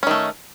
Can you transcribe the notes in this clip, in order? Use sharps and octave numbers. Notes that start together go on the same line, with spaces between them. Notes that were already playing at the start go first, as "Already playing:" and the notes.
D#3 A3 C#4